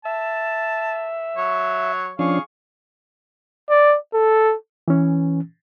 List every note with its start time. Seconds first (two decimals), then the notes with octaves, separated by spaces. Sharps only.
0.05 E5 A5
1.37 F#3 C#5
2.19 F3 C#4 D4 G#4 F5 C#6
3.70 D5
4.14 A4
4.88 E3 C#4